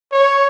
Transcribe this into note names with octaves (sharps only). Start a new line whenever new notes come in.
C#5